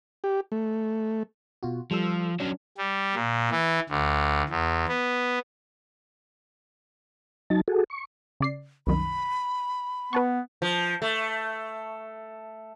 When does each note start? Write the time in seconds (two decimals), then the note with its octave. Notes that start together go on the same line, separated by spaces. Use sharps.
0.24 G4
0.52 A3
1.63 B2 F4 F#4
1.91 F3 G3 A4 E6
2.40 F#3 C#4 D4
2.78 G3
3.15 A#2
3.51 E3
3.90 D2
4.49 E2
4.88 B3
7.50 F#3 D#4 A5
7.68 F#4 G#4 A4
7.90 C#6
8.40 C#3 D5 C7
8.87 C2 F#2 D#3 B5
10.13 B3 B4 A5 C#6
10.62 F3
11.02 A3